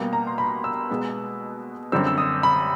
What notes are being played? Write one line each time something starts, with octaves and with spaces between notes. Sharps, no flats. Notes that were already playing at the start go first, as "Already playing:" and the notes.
Already playing: B2 G3 A#3
A#5
C6
B5
E6
B2 G#3 B3
F#2 D3 G3 C4 E6
E6
D#6
B5